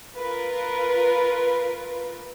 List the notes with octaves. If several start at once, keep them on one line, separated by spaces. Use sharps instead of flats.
F4 A#4 B4